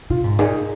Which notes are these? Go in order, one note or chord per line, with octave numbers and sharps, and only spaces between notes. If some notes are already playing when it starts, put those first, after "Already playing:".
C3 F4
G#2
A#2 D#4 G#4